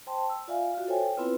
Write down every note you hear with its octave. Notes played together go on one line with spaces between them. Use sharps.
C5 G5 A5 C6
E6
F4 D5 E5 F5 G#5
F4 F#4
A4 C5 C#5 E5 G5 G#5
B3 C4 E4 F4 B4